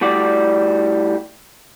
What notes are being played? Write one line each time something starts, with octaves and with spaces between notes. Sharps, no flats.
A2 G3 F#4 D5